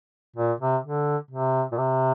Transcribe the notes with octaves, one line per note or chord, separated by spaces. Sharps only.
A#2
C3
D3
C3
A#2
C3